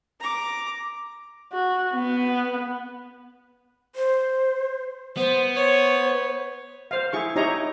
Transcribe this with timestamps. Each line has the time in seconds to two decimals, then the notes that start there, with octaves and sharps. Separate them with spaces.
0.20 A#5 D6
1.52 F#4
1.95 B3
3.95 C5
5.17 B3 C5
5.56 C5 C#5
6.91 C5 F5
7.13 E4 G#4 C#6
7.36 D#4 E4 G4 C#5 D#5 A#5